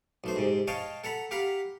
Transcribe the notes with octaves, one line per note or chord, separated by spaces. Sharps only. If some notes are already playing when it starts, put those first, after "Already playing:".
B1 A3 C5
G#2 C3
C#5 D#5 F5 G5 A5
A4 F#5 A#5 B5
G4 F5 F#5 A#5 B5